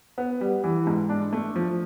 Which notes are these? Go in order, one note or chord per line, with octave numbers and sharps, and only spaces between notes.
B3
G3
E3
G#2
D4
A3
F3